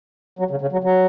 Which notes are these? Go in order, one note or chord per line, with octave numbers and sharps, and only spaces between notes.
F#3
C#3
C#3
F#3
F#3